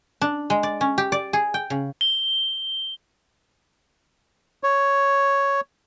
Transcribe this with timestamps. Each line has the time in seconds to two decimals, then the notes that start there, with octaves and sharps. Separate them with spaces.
0.21 D4
0.50 G#3
0.63 D5
0.81 C#4
0.98 G4
1.12 D5
1.33 G#4
1.54 G5
1.70 C#3
2.01 G7
4.63 C#5